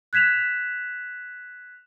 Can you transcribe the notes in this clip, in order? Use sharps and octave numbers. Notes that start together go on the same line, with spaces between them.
F#6 G#6 B6 E7 F7